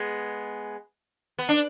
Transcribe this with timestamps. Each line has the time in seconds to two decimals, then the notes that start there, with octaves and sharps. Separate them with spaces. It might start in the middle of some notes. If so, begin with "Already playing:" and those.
Already playing: G#3 B3
1.38 B3
1.49 D4